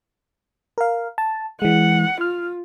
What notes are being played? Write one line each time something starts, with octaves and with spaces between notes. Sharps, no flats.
A#4 F5
A5
E3 G#3 F#5
F4 F6